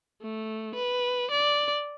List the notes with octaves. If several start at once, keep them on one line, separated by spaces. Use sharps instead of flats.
A3
B4
D5